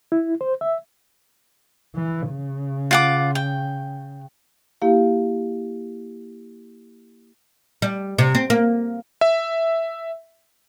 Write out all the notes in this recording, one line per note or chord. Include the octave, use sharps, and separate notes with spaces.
E4
C5
E5
E3
C#3
F4 F#5 D6
G5
A#3 E4 G4 F5
G3
C3
C4
A#3
E5